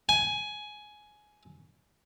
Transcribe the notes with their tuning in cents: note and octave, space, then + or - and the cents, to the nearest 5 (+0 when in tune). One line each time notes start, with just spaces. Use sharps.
G#5 +15